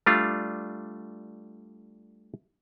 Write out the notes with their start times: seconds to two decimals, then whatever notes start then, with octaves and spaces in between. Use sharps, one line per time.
0.06 G3 A3 D4 F4